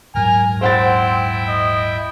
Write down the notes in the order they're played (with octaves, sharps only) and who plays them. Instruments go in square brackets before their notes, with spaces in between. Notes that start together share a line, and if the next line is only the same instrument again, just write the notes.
[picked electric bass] D#1 G#2 F#3 [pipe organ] A#4 F6 [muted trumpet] G#5
[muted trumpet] C4 [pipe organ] E4 G5 [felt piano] C5 F#5 A6
[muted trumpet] D#5